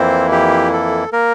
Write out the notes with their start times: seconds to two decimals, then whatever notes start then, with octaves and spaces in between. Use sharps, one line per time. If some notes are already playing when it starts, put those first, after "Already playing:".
Already playing: F2 E3 A#3 C4 E4 C5
0.32 G4
0.73 A4
1.13 A#3 A#4